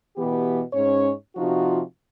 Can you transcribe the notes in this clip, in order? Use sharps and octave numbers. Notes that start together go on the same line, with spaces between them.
B2 E3 B3 G4
G#2 C#4 C#5
C3 F3 D#4 F4 F#4